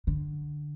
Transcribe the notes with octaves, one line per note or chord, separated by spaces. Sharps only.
D3